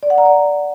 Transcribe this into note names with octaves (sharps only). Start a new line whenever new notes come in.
D5
F#5
A#5
D5